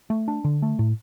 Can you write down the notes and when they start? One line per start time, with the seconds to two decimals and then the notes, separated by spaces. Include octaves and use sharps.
0.10 A3
0.28 D4
0.45 D3
0.62 A3
0.79 A2